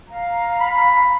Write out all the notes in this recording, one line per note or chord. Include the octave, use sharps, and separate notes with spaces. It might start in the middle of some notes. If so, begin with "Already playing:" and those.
F5 A#5
B5